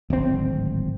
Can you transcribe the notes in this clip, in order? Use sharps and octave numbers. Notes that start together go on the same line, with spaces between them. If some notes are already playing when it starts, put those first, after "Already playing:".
D1 G#1 C4